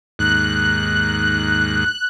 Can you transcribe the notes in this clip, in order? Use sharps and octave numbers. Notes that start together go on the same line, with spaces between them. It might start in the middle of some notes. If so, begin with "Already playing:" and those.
D#2 G#2 F#6